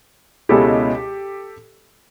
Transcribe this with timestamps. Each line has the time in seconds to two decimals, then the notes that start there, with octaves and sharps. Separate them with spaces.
0.49 C#2 B2 G#3 C#4 E4 G4 A4